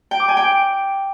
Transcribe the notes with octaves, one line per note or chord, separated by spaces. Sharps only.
G5
D6
G#5
G5